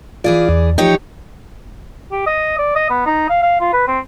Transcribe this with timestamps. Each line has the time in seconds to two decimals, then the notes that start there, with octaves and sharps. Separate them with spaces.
0.24 E3 F4 G#4 D5
0.49 E2
0.78 F3 D#4 G4 C#5 G5
2.12 G4
2.27 D#5
2.58 D5
2.76 D#5
2.90 B3
3.06 D#4
3.30 F5
3.42 F5
3.60 F4
3.73 B4
3.88 C4